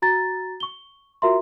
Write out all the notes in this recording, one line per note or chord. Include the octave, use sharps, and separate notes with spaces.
F#4 A#5 A6
C#6 G7
F4 F#4 A#4 E5 A#5 C6